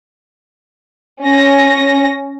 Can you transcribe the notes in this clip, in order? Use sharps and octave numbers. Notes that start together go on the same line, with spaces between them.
C#4 A#6